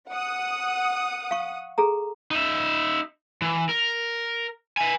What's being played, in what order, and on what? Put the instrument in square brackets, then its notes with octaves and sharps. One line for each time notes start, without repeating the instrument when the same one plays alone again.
[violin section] F#5 D#6
[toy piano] F5 C#6
G#4 A4 A#5
[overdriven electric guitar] D#4 E5
E3
A#4
E5 G#5